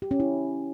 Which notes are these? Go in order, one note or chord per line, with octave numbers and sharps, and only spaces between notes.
G4
C#4
E4